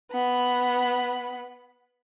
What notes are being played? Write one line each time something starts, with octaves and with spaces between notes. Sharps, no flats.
B3 B5